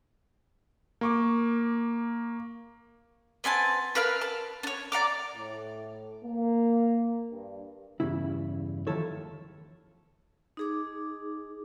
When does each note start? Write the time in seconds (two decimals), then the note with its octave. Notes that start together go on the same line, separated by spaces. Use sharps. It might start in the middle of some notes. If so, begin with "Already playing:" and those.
1.01 A#3 C#6 D6
3.44 B3 C4 G#5 A5
3.95 A#4 B4 F5 E6
4.21 A5
4.63 D4 C#5
4.92 D5 F#5 A#5 D6
5.35 A2
6.25 A#3
7.31 G2
8.00 E2 G2 C#3 G3 E4
8.87 D#3 F3 A3 E4 A4 C#5
10.57 D#4 G#4 D6